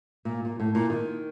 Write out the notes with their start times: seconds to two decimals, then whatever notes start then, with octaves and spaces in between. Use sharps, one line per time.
0.25 A#2
0.45 A#2
0.60 A2
0.75 A#2
0.90 D#3